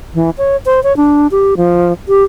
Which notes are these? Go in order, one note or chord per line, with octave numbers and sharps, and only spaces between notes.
E3
C#5
C5
C#5
D4
G4
F3
G4